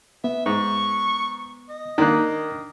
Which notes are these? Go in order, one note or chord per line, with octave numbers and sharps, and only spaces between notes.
B3 E5
G#2 C#6
D#5
D#3 A#3 D4 A#4 F#6